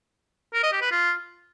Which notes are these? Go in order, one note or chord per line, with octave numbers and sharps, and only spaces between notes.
A#4
D#5
G4
B4
F4